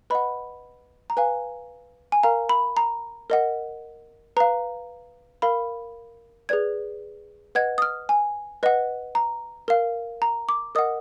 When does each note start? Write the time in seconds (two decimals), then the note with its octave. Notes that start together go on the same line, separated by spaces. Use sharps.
0.10 B4 D#5 F#5 B5
1.10 A#5
1.17 B4 F5 G#5
2.12 G#5
2.23 A#4 F5 A#5
2.49 B5
2.77 A#5
3.30 A#4 D#5 F#5
4.37 B4 F5 A#5
5.42 A#4 F5 B5
6.49 G#4 B4 D5 G#6
7.55 B4 D#5 F#5 G#6
7.78 D#6
7.82 F6
8.09 G#5
8.63 B4 D#5 F#5
9.15 A#5
9.68 A#4 F5
10.22 A#5
10.49 D6
10.75 A#4 D#5 F#5 D#6